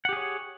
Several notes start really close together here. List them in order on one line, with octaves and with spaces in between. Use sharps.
F#5 G4 G#4 C#5